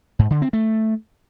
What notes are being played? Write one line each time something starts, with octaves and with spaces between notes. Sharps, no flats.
G#2
D3
C4
A3